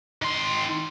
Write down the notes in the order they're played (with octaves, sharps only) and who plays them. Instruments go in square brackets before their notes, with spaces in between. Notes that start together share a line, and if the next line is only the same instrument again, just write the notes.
[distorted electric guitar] D#3 C6